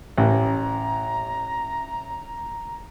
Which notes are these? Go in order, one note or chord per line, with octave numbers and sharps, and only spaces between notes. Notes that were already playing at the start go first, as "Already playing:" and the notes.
A1 A#5